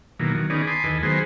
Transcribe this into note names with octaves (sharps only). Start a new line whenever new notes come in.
B2 D#3 E3 F#3 A#3
D#3 F#3
D#3 B3 C#4 D#4 G#4 D5
G#5 A5 B5 C6 D6 D#6
D#2 E3 A4 B4 D#5 G#5
D#3 F#3 G#3 B3 G#4 C5